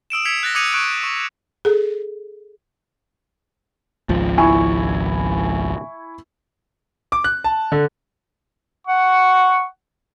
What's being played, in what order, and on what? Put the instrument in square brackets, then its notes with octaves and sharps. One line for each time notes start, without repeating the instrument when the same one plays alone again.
[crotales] D#6 E6 D7 E7
E6 G#6 B6 C#7 F7
F#6 A6 A#6
D6 D#6 G#6 C#7 D#7 F7
C#6 F#6 G#6 D7 D#7
C#6
[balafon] G#4 A4
[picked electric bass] G#1 C#2 F3
[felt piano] E4 G#5 C#6
[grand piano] D6
F#6
A5
D3
[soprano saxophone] F#5 [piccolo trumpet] C#6